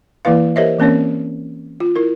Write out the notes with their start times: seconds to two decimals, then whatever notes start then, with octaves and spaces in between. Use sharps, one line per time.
0.25 E3 A#3 E4 B4 F5
0.56 G4 A#4 C5 C#5 D#5 E5
0.79 E3 A#3 C4 C#4 A#4 C#5
1.80 F4
1.96 E4 A#4